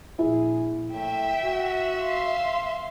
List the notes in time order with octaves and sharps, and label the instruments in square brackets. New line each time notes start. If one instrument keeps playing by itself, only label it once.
[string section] A#1 [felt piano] E4 [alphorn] G#4
[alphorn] A2 [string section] E5 [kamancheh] G5
[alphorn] F#4
[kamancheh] F5 C6